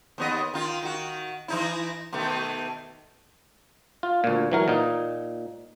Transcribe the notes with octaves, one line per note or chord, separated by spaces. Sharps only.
D#2 B3 D#5
D#3 F4
D#3 F#4
E3 D#4 E4
B2 D#3 A3
F4
D2 A#2
E3 F#3 A#4
A#2 D#4